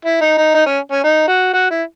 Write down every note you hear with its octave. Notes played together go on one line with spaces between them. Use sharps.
E4
D#4
D#4
D#4
C#4
C#4
D#4
F#4
F#4
E4